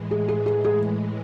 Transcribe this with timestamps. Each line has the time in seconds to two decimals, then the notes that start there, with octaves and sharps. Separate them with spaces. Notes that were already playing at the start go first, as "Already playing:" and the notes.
Already playing: A2 E3 G#3
0.11 G#4
0.28 G#4
0.46 G#4
0.65 G#4